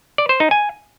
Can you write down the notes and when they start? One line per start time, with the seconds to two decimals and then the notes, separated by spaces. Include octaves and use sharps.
0.18 D5
0.29 C5
0.40 D#4
0.51 G#5